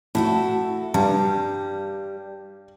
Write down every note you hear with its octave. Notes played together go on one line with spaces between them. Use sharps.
A2 E4 F#4 A4
G2 G3